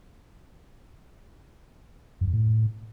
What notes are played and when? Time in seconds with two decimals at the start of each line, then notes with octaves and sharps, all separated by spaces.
2.21 F#2
2.27 F2
2.33 A2